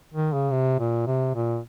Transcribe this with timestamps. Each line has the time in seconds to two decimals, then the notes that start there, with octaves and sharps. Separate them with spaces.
0.14 D#3
0.33 C#3
0.52 C3
0.79 A#2
1.06 C3
1.34 A#2